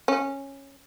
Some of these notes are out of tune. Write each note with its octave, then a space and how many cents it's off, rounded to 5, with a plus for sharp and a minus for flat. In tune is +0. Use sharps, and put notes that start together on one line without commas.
C#4 -10